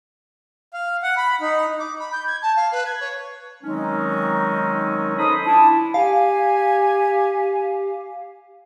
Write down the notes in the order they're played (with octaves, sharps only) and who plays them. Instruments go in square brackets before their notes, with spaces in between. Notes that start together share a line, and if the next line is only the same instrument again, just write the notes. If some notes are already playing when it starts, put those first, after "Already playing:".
[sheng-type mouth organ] F5
F#5
B5
D#4
[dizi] D6
B5
G6
G#6
A5
F5
B4
G#6
C#5
[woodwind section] D#3 F#3 G#3 C4 C#4 D#4
D#4 A4 C5 D#5 B5 D#6
D4 E4 F4 A5
[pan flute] G4 [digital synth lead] F5 [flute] G#5